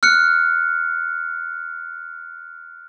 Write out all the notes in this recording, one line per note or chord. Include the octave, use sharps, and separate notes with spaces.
F6 F#6 C#7